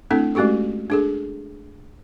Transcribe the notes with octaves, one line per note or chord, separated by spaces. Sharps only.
A3 C4 D4 E4 A4
G#3 A3 C#4 F#4 G4 A4
D4 G#4 A4